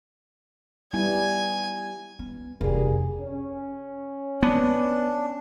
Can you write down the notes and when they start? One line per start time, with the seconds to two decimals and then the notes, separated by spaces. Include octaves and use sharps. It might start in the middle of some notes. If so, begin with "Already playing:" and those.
0.93 G3 B3 E4 G#5
2.19 B3
2.61 F1 D2 G3 A#3 G#4
3.20 C#4
4.43 B3 D4